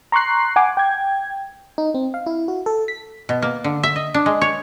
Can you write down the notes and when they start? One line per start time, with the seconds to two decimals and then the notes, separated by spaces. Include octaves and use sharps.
0.12 A#5 C6 C#6 F#6 C7
0.56 F#5 G#5 D6
0.77 G5 G#6
1.78 D#4
1.94 C4
2.14 F5
2.26 E4
2.48 F#4
2.66 A4
2.88 B6
3.29 B2
3.42 A#3
3.64 D3
3.83 E5
3.96 D#5
4.14 D4
4.26 G#3
4.41 C#5